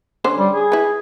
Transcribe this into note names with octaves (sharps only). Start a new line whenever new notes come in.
D3 C#4 C5
G3
G#4
E4 B4